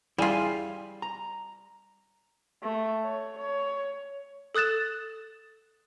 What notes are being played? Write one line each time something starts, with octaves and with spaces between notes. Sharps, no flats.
G3 E4 F4 G#4 G#5
A#5
A3
C#5
C#5
A4 D#6 F#6 A6 E7